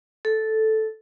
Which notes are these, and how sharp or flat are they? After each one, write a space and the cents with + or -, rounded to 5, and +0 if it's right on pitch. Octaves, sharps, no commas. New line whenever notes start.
A4 -5